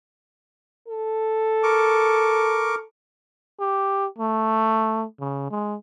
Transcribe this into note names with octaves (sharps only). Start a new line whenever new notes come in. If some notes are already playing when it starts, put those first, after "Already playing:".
A4
A#4 C#6 D6
G4
A3
C#3
G#3